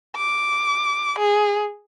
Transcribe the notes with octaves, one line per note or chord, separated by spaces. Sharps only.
D6
G#4